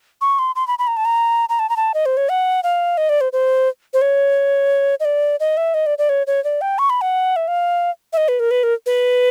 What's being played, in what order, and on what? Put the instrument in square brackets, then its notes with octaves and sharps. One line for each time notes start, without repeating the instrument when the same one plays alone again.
[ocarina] C#6
C6
C6
B5
B5
A#5
A5
A#5
A#5
A5
A#5
A5
D#5
C5
C#5
F#5
F5
D#5
D5
C5
C5
C5
C#5
D#5
D5
D#5
E5
D#5
D5
D5
C#5
C#5
D5
G5
C#6
B5
F#5
E5
F5
E5
D#5
B4
A#4
B4
A#4
B4